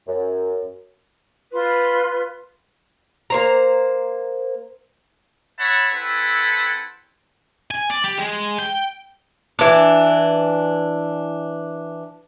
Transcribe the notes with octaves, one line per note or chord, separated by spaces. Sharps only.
F#2
F4 B4 C6
A#3 C5 A#5
C#5 E5 F#5 A5 B5
C4 E4 A4 B4 F#5
G#5
D5
G4
G#3
G5
E3 D4